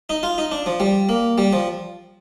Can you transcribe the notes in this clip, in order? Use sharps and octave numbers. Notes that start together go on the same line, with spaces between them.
D#4
F4
D#4
D4
F3
G3
A#3
G3
F3